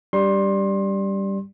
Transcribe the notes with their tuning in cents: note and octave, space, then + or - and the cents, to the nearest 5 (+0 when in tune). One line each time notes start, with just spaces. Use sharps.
G3 +0 D4 -30 C6 +25